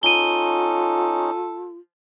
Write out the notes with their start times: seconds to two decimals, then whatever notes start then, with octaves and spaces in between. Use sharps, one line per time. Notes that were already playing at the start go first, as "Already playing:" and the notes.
0.03 C#4 D#4 F4 A4 D#7 G7